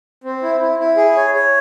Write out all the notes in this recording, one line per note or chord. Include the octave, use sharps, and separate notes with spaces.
C4
E4
E4
E4
G#4
C#5
C#5